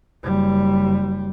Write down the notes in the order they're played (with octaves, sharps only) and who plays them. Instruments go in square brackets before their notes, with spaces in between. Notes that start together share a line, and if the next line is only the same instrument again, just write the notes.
[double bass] F#1 G3